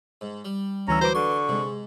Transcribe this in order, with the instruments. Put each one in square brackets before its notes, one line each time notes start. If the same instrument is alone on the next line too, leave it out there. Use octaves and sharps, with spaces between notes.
[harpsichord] G#2
G3
[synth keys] D2 E3 E6 [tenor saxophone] C#4 [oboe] A#5
[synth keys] F#3 B4 D6 [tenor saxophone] C5
[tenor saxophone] D3 [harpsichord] C6 [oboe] C#6
[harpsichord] G#2 [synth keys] C3 G#3